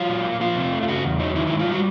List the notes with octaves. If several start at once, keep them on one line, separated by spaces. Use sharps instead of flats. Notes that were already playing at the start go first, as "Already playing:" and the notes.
Already playing: F#3 F4
A#2
A#3
F3 F4
C3
A3
F4
C#3 F#4
E2
F#3 D#4
D#3 E4
G#2 E4
F4
G3 F#4